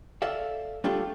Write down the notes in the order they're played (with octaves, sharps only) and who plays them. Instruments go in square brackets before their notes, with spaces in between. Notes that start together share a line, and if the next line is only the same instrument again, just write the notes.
[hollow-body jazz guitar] A4 D5 E5 F5
G3 A3 D4 F4 G4 A4